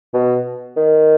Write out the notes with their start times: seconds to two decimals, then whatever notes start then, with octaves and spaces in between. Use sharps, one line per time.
0.13 B2
0.76 D#3